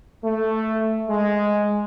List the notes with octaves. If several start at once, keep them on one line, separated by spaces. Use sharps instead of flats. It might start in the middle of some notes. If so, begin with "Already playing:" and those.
A3
G#3